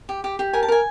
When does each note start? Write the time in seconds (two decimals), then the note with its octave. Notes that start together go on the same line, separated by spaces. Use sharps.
0.09 G4
0.24 G4
0.39 G4
0.53 A#4 G#5
0.63 A5
0.68 A#4 G#5